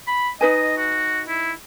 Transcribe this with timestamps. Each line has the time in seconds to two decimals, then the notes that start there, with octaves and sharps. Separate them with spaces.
0.07 B5
0.41 D#4 B4 D#5 G#5
0.78 F#4
1.27 E4